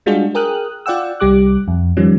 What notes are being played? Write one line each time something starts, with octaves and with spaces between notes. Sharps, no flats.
G3 G#3 D4 F4 F#4 G#4
G#4 A#4 G5 D#6 F6 F#6
F4 D5 F#5 G5 E6
C2 G3 G4 D6 F#6
F2
D#3 F3 G3 C#4